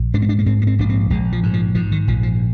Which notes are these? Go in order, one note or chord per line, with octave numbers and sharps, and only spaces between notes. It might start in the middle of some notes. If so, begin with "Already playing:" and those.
Already playing: A#1
G#2 D4
C4
D4
A#3
G#2 C4
A#3
C4
A#1 D4
C4
A#1 G#3
F3
G#2
F3
G#2 F3
D#3
A#1 F3
F3